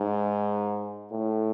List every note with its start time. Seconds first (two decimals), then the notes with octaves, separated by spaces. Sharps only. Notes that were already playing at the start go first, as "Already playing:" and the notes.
Already playing: G#2
1.11 A2